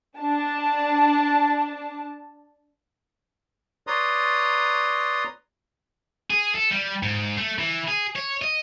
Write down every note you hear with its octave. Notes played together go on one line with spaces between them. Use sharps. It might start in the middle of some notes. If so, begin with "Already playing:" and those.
D4 A5
B4 C#5 D5 A#5 C6 D#6
G#4
A4
G3
G#2
A3
E3
G#4
C#5
D#5